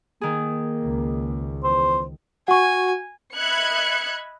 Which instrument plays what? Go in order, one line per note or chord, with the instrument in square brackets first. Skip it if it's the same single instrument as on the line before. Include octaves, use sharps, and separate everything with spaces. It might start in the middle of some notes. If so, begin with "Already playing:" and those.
[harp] D#3 G#4 [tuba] A#3
[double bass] C#2
[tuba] E2 [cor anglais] C5
[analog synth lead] F#4 [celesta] F#5 C#6 [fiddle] G#5
[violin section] D#5 E5 B5 F#6 G#6 C#7